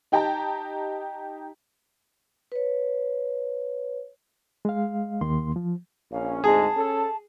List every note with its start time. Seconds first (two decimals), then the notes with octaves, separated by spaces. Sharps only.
0.12 D#4 G4 G5 A5 A#5
2.52 B4 C#5
4.65 G#3 F5
5.21 D#2 D#3 A#3 C6
5.56 F3
6.12 A#1 C#4 F5
6.44 D2 G#2 G#3 G#4 A5
6.77 C#4 A4